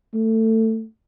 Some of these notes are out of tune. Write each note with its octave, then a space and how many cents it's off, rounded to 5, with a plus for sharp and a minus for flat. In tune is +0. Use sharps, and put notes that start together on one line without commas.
A3 +20